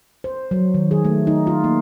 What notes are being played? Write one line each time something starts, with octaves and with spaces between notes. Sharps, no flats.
C5
F#3
D#3
G#4
A3
D#4
F4
A#3